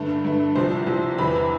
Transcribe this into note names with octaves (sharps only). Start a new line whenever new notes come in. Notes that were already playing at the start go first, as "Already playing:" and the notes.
Already playing: G2 D3 A3
G2 D3 A3
C2 C3 F3 C5
C2 C3 F3
E2 C3 E3 B3 B5